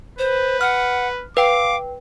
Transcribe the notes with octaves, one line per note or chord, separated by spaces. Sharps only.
B4 C5
F#5 F6
B4 F5 G5 D6